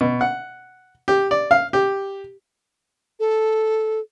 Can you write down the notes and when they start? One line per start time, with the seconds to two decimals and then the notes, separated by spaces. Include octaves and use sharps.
0.01 B2
0.21 F#5
1.08 G4
1.31 D5
1.51 F5
1.73 G4
3.20 A4